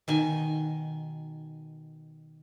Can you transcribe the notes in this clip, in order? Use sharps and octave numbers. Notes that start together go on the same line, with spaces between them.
B2 D#3 G#5